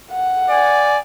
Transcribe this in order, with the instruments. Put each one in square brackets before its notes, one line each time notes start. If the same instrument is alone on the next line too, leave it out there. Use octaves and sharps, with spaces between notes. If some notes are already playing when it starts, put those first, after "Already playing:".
[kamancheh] F#5
[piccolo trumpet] D5 [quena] G#5